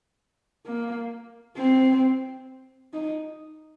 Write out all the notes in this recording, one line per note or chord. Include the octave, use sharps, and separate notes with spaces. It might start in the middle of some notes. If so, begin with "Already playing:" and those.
A#3
C4
D#4